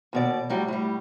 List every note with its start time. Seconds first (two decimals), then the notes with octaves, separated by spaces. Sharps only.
0.13 D#2 B2 D5
0.50 A2 F#3 G3
0.68 A2 G3